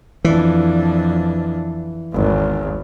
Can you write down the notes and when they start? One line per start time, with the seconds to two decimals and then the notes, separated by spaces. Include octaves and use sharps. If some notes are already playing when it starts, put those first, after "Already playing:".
0.25 F2 E3 D4
2.12 G#1 E2